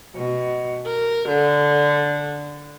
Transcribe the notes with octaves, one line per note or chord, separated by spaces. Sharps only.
B2
A#4
D3